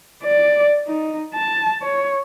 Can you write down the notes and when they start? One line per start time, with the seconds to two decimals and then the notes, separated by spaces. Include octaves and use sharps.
0.23 D5
0.87 D#4
1.34 A5
1.82 C#5